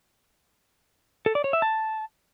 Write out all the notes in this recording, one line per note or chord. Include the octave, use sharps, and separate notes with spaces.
A4
D5
C#5
E5
A5